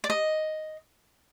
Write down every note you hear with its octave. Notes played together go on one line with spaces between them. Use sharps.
D5
D#5